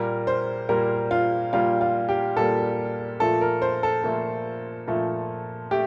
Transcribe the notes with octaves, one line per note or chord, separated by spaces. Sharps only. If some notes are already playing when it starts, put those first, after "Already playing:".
Already playing: A#2 G3 A#3 A#4
C5
A#2 G3 A#3 A#4
F4
A#2 G3 A#3 F4
F4
G4
A#2 G3 A#3 A4
A#2 F3 A3 A4
A#4
C5
A4
A#2 F3 A3
A#2 F3 A3
A3 G4